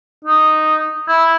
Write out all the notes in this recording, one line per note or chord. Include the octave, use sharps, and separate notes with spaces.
D#4
E4